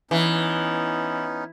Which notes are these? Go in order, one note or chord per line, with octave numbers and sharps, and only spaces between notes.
E3 B3 C#4 D#4